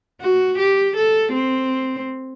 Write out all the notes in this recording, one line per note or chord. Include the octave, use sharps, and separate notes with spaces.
F#4
G4
A4
C4